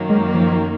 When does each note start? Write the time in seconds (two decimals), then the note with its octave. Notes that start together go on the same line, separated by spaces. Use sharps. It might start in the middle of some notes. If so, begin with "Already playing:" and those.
Already playing: F#2 D#3 F#3 A#3
0.10 G#3
0.35 F3